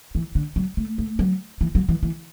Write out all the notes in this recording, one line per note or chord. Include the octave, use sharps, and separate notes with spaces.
E3
D3
F#3
A3
A3
F#3
E3
F#3
E3
E3